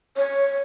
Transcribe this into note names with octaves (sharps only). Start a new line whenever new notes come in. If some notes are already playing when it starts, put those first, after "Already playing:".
C#5